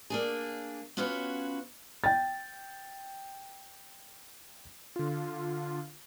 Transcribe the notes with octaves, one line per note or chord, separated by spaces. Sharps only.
A#3 D4 G#4
B3 C#4 F4 F#4 B4 C#5
G5 A6
D3 F4